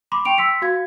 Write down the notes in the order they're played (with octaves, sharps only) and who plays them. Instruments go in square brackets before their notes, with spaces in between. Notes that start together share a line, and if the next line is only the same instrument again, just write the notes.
[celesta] B5 C6 D6
G5 C#6 D7 F7
C6 E6 B6 C#7
F#4 F5 G#6